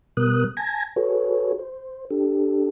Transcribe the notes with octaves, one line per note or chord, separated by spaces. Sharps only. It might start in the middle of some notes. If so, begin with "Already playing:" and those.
B2 G3 B3 A#4 D#6 F#6
G#5 A5 G#6 A#6
F#4 G#4 A4 B4 C#5
C5
D4 G4 A4